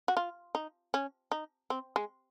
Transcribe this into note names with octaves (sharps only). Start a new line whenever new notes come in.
F#4
F4
D#4
C#4
D#4
C4
G#3